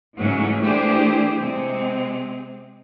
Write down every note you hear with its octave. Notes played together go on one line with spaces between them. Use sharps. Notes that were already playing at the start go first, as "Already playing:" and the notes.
G#2 C#3 E3 F#3 A3 C#4
E3 A3 D4 G4 G#4 C5
C3 G#3 C4